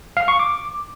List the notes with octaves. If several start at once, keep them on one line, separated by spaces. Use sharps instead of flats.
F5
C#6
D6